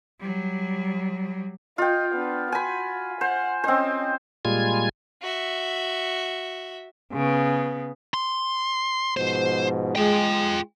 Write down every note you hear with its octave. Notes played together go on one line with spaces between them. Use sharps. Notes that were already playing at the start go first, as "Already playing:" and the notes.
F#3 G3
F4 D#5 G5
B3 D4
F#4 G#5 B5
C5 F#5
C4 C#4 C5 D#5
A#2 G3 G#3 F4 G#5 G#6
F#4 E5
C#3 B3
C6
G#2 B2 F3 C5
G#3 F4 G5